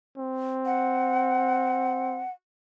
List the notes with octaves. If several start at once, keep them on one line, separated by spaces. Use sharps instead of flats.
C4
F#5